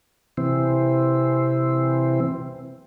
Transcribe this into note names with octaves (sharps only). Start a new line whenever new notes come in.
C3 E3 C4